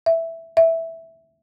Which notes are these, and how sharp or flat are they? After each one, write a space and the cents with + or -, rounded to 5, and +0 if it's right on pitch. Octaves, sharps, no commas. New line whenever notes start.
E5 +0
E5 -5